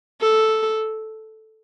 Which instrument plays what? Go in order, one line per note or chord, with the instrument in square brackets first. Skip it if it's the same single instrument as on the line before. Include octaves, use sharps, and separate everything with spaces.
[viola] A4